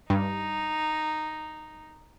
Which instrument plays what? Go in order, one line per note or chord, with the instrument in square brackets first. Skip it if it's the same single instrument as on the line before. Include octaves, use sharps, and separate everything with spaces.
[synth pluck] G2 [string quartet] D#4